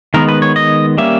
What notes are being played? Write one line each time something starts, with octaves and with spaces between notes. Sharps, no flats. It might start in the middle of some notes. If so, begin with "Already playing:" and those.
D#3 G#3 B3 A#4
B4
C#5
D#5
G3 A#3 C#4 E5